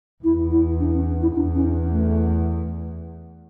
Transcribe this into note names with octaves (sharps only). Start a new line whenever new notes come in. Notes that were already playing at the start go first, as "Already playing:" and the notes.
E2 E4
E4
D4
C#4
E4
E2 D4
C#4
A3